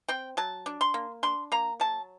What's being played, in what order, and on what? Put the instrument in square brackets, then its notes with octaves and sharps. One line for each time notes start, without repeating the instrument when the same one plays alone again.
[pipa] C4 G5
F#3 A5
D4
C6
A#3
D4 C6
A#3 A#5
F#3 A5